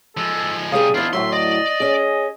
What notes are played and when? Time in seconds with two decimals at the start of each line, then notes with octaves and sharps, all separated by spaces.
0.17 F3 G#3 A4
0.72 C3 G3 G#4 D5 F5 D#6
0.94 E2 D4 E4 F4 D#5
1.13 D2 A2 F#3 E5 C6
1.32 D5 D#5
1.80 C#4 G#4